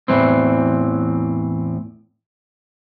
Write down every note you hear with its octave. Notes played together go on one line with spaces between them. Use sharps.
E2 A2 E3 C4